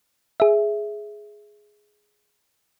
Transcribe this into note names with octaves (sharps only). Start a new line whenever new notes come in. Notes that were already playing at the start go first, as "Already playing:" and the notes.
G#4 E5